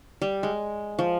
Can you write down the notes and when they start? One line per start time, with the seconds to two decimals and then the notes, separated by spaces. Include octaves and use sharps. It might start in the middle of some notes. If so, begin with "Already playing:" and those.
0.22 G3
0.43 G#3
0.99 F3